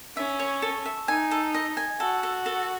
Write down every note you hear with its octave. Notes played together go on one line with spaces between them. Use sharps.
C#4 E5
C#5
A4
E5
D#4 G#5
A4
D#5
G#5
F#4 A4
A4
A4